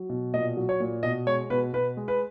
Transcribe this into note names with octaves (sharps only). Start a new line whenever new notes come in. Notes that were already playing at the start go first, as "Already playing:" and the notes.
Already playing: F#3
B2
A#2 D#5
F#3
C#5
A#2
B2 D#5
G#3 C#5
B2 B4
B2 B4
G#3
B4